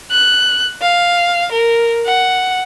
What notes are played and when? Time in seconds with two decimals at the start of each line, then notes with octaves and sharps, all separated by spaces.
0.11 F#6
0.81 F5
1.52 A#4
2.05 F#5